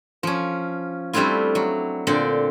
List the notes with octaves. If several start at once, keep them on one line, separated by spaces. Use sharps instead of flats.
F3 C#4
G3 A3 C4 D4 E4 F4
F#3
A#2 D3 C4 D5